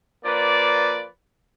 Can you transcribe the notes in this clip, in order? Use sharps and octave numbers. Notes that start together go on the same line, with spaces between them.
F3 A#3 B4 D5